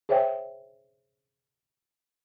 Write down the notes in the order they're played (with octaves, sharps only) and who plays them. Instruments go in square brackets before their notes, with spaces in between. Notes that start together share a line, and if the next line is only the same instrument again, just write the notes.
[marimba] G#4 C5 C#5 E5 G5